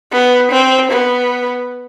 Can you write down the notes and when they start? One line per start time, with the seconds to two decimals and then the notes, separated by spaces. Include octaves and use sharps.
0.13 B3
0.52 C4
0.91 B3